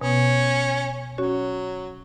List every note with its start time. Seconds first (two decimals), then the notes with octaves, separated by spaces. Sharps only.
0.01 B2 B3 C#4
1.18 F#3 C#4 F#4 C#5